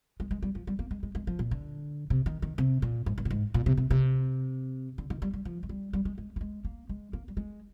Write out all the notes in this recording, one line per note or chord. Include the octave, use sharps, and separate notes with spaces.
G#3
G#3
G3
F3
G3
A#3
G#3
G#3
G#3
F3
A#2
D3
C3
D#3
D#3
C3
A#2
G#2
G2
A#2
G#2
A#2
C3
C3
C3
D3
D#3
G3
G3
F3
G#3
G3
G3
G#3
G#3
A#3
G#3
A#3
G#3
A#3
G3
G#3